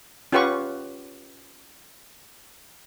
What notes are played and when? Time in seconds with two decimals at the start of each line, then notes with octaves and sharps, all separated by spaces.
0.32 C#4 F4 G4 B4 F#5 C#6